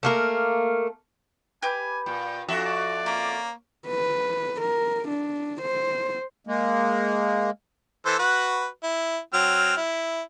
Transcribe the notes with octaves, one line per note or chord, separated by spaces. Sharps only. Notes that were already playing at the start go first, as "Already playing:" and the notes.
A3 A#3 A#4
G4 B4 G#5 D6
A#2 G5
F2 D4 F#4 E5
D5
A#3 C#4 D6
B4
A#4
D4
C5
G#3 A#3
E3 A4 C5
F#4 B4
E4
F#3 C4 F6
E4